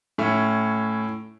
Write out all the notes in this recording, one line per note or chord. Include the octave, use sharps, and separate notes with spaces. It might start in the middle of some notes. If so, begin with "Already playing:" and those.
A2 C#4 E5